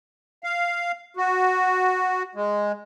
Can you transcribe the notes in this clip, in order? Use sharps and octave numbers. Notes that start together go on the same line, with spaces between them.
F5
F#4
G#3